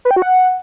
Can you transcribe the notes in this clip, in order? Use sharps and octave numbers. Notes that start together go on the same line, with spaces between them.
B4
G5
F#4
F#5